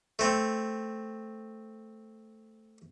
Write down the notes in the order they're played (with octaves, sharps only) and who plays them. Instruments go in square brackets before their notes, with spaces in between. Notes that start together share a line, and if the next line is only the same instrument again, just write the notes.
[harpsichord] A3 C4